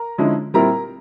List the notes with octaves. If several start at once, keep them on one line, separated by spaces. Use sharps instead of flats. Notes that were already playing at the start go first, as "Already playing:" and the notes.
Already playing: A#4 A#5
D3 F3 G#3 C#4 E4
A#2 G3 C4 E4 A#4 A#5